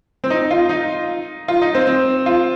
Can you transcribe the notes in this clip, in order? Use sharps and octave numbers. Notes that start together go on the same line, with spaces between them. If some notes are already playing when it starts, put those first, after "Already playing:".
C4
D#4
F4
D#4
F4
D#4
C4
C4
F4